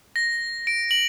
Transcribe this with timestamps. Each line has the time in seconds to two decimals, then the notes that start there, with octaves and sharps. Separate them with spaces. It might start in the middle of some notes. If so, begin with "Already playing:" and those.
0.16 A#6
0.67 D7
0.91 F#7